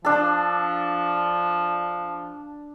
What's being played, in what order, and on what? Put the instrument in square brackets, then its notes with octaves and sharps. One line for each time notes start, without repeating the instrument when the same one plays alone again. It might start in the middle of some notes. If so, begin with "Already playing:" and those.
[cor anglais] F3 [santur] D4 A4